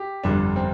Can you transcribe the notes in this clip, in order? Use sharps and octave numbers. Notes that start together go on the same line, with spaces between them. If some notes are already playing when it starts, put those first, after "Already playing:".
Already playing: G4
G1 F2 D3 G3 D4
C4